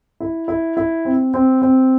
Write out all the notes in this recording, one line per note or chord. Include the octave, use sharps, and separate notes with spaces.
E4
E4
E4
C4
C4
C4